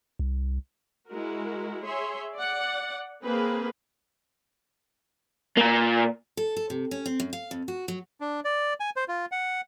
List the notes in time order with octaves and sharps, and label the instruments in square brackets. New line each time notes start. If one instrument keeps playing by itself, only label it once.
[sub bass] C2
[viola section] G#3 E4 F#4 A#4
G#4 C#5 E5 C6
D5 F#5
A#3 C4 G#4 A#4 B4
[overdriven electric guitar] A#2 A#3
[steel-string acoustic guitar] A4
A4
C3
C#4
C4
F#2
F5
F2
F#4
F#3
[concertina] D4
D5
G#5
C5
F4
F#5